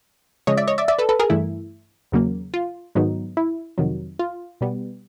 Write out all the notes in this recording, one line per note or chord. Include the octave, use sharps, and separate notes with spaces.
C#3 F3 G#3 C#5 D#5
D5 E5
C#5 D#5
D5 E5
D5 E5
A4 B4
A4 B4
G#4 A#4
G2 E3 A3 E4
E2 C#3 F#3 A#3
F4
G#2 D#3 F#3 B3 D#4
E4
F2 C3 D#3 F#3
F4
B2 G3 B3